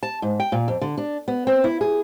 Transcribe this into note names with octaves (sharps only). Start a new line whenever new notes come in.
A5
G#2
G5
A#2
F2
D3
D4
B3
C4
E4
G#4